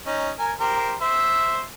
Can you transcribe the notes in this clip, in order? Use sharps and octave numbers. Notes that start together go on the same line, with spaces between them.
C#4 D#4
A#4 G#5
G4 A#4 C5
C5 E5